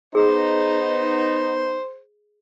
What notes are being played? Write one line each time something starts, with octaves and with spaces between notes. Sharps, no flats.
B3 D#4 G#4 C5